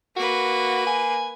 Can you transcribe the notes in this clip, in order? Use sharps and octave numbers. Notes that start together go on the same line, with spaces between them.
A#3 F#4 B4
G#5